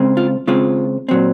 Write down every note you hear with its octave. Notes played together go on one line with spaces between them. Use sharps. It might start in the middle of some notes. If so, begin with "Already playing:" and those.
Already playing: C#3 G#3 C4
F4
C#3 G#3 C4 F4
A#2 F#3 C4